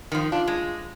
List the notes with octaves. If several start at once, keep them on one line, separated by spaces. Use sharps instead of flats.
D#3 F3
D4 F4
G#3